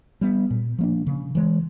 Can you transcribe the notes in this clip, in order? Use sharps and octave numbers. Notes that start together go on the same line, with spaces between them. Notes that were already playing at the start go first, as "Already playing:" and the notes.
G3 B3
A#2
F3 A#3 D4
C#3
E3 G#3